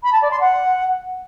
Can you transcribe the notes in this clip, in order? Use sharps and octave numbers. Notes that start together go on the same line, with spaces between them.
B5
A5
D5
C6
F#5